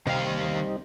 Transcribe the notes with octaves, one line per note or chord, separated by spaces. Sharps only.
C2 C3 D#3 G3 C4 D#4 F5